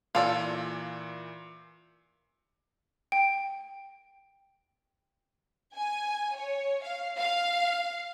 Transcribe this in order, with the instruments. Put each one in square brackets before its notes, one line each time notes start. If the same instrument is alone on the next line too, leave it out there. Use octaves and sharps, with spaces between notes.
[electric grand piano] A#2 E3 [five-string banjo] F4 A4 D5
[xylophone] G5
[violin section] G#5
C#5
F5
F5